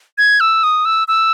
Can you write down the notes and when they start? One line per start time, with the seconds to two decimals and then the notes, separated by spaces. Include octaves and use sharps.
0.18 G#6
0.40 E6
0.63 D#6
0.85 E6
1.08 E6